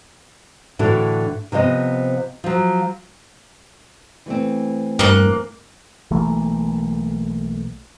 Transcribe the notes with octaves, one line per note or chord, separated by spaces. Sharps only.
A2 D3 E3 D4 F#4
C3 F3 B3 D#5
F3 F#3
E3 A3 C4
G2 A#3 F#6
B1 E3 A3 A#3